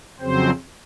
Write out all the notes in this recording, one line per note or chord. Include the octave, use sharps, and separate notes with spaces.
F2 C#3 F#3 C4 C5